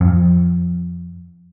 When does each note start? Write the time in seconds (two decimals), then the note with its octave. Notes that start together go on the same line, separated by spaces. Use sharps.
0.01 F2